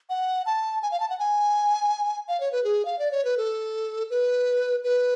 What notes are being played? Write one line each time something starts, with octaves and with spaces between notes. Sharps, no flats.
F#5
A5
G#5
F5
A5
F#5
G#5
F5
C#5
B4
G#4
F5
D5
C#5
B4
A4
B4
B4